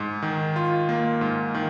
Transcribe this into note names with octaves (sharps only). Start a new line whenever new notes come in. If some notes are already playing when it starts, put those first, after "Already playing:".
Already playing: G#2
D#3
F4
A#3
G#2
D#3